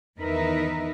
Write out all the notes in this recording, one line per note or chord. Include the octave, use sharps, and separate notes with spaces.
E2 D#3 D#4 A#4 B4 E5